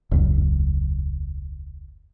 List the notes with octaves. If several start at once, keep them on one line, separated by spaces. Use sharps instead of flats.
E1 C#2 F#2